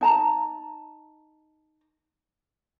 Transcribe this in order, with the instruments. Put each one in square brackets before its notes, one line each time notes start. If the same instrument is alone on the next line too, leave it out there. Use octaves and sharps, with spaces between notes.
[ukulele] D#4 A5 A#5